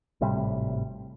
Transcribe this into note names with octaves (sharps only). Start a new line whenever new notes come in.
G#1 A2 C3 G3